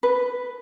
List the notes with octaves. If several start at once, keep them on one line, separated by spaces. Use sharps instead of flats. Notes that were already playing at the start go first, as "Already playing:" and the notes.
B4